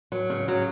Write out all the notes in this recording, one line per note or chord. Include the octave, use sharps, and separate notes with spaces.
F#3
C#3
F#3